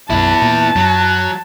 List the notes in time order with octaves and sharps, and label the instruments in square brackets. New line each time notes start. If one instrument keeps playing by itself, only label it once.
[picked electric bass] B1 F#2 [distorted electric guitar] B3 E4 [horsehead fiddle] A5
[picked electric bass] A#2
[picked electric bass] F#2 [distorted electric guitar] F#3